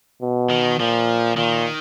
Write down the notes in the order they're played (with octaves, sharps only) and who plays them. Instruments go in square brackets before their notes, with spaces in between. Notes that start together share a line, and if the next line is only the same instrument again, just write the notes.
[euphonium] B2
[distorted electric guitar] D#3
[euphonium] A#2 [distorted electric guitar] F3
[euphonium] A#2 [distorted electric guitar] D#3